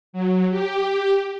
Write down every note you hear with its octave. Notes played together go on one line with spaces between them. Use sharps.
F#3
G4